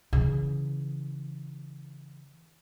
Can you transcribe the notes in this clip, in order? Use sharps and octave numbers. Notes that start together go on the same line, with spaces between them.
C#3 E3